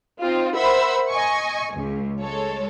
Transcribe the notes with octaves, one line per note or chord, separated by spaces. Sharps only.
C4 D#4 F4
A#4 C5 E5 F#5 B5 E6
D#5 G#5 C#6
C#2
G#3 A4 C#5